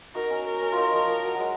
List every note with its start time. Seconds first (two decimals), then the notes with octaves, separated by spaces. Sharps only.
0.15 D#4 F#4 A#4
0.30 C#4
0.46 A#4
0.61 C#4
0.72 D#4 F4
0.92 F3
1.08 F3
1.24 F#3
1.35 F#3 G#3